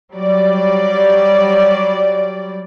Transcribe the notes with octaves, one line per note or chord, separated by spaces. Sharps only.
F#3 G3 D5